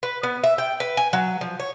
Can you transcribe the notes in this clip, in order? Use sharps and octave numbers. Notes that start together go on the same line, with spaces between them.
B4
B3
E5
G5
B4
G#5
F#3
F3
C#5